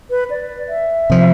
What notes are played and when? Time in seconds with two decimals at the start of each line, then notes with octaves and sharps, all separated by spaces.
0.10 B4
0.30 D5
0.68 E5
1.10 C3 F3